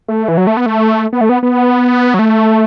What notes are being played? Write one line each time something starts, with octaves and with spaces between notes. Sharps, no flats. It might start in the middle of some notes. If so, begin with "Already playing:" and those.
A3
E3
F#3
A3
B3
A3
B3
A3
B3
B3
F#3
A3